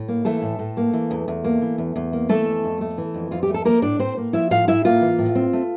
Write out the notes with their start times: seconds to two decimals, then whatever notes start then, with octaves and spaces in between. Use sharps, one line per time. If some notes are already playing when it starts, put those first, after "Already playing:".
Already playing: A2
0.08 A#3
0.25 E3 A3 A4
0.42 A2
0.59 A2
0.77 A#3
0.93 E3
1.11 E2
1.28 E2
1.44 A#3
1.62 E3
1.78 E2
1.96 E2
2.13 A#3
2.29 E3 A3 A4
2.46 F2
2.64 F2
2.81 A3
2.98 E3
3.14 F2
3.31 F2 F4
3.43 G4
3.49 A3
3.54 A4
3.65 F3 A#3 A#4
3.82 A2 D4 D5
3.99 A2 C4 C5
4.17 A#3
4.33 F3 E4 E5
4.51 A2 F4 F5
4.68 A2 E4 E5
4.85 A#3 F4 F5
5.01 E3
5.19 A2
5.35 C4
5.53 A3